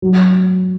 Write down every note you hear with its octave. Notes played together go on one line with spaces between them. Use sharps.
F#3